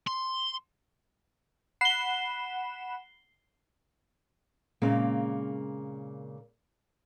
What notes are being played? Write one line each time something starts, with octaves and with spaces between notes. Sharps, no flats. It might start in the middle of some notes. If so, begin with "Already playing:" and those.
C6
F#5 B5 C7 E7 G7
A#2 C#3 G#3 A#3 C4